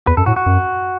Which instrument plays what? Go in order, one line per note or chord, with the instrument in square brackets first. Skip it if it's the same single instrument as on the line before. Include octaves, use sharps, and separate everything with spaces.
[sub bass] E2 [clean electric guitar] B4
[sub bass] F#2 [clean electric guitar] A4
[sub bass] A2 [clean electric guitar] F#4
[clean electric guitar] F#4
[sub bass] F#2